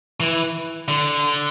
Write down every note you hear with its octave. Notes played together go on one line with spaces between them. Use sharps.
E3
D3